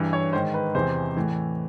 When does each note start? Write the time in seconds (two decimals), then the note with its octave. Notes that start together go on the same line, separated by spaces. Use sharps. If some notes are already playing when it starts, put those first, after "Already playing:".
Already playing: G2 E3
0.13 C#5
0.33 G#2 D#3 C5
0.54 B4
0.75 E2 C3 E3 C5
1.17 A2 E3